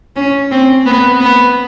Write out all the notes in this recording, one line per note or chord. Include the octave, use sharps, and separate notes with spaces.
C#4
C4
B3
B3